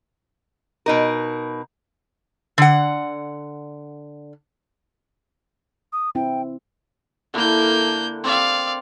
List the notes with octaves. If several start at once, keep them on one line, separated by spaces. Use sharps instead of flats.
B2 D#4 A#4
D3 F#5
D#6
C4 E4 G5
D3 A#3 E4 A#4 G6
C4 D5 F5